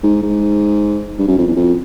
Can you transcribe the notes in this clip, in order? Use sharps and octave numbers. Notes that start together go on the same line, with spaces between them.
G#2
G#2
G2
F#2
F2
E2
F2